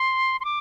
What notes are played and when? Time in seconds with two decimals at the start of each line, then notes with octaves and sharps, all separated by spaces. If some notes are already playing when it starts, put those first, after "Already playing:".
Already playing: C6
0.40 C6
0.45 D6